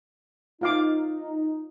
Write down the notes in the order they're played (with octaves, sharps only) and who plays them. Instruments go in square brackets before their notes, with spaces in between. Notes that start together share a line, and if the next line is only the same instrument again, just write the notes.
[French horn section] D#4 [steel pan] F4 F5 D6